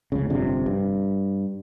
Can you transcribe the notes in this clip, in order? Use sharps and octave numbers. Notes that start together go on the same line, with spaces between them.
F1 C#2 C#3
G1 F2 C3 D4
G2